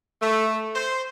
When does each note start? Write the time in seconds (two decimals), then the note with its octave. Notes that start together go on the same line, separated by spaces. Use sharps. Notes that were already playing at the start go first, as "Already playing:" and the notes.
0.21 A3
0.75 C5